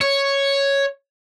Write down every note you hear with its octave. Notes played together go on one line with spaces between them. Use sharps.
C#5